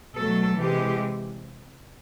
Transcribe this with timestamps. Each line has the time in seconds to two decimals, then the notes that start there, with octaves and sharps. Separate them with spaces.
0.16 B2 F#3 A3 A4
0.60 C3 E3 G#3 G4